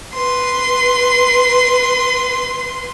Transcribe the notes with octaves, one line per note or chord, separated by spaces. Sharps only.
B4 C6